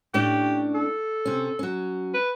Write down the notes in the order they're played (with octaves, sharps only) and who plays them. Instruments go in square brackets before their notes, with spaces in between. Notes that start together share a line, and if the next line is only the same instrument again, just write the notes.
[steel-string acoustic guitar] A2 C#4 D4 [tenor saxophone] G4
[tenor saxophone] A4
[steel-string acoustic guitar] C3 C#4
F#3 C#4
[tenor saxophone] B4